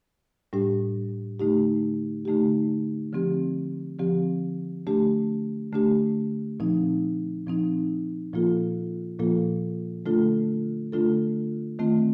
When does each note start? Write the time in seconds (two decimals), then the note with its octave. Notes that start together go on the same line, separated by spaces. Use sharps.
0.53 A2 G3 D4 G4
1.40 D3 A3 D#4 G4
2.25 D3 A3 D#4 G4
3.12 D3 F3 C4 G4
3.99 D3 F3 C4 G4
4.87 D3 A3 D4 G4
5.72 D3 A3 D4 G4
6.60 A#2 F3 C4 D#4
7.46 A#2 F3 C4 D#4
8.33 A#2 F3 A#3 F4 A4
9.19 A#2 F3 A#3 F4 A4
10.06 D3 A3 D4 F4 A4
10.92 D3 A3 D4 F4 A4
11.79 D#3 A3 C4 F4